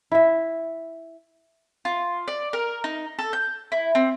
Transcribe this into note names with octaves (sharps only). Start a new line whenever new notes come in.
E4 E5
F4
D5
A#4
D#4
A4
G6
E4
C4